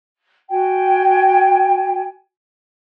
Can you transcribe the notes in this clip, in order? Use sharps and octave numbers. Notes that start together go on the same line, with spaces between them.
F#4 G5 G#5